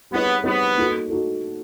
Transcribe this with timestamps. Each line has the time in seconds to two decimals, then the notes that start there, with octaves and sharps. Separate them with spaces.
0.11 G3 B3 C4 D#4 G#4 C#5
0.44 G3 B3 C4 D#4 G#4 C#5
0.77 A#3 D#4 F#4 A4
1.10 D#4 F#4 A4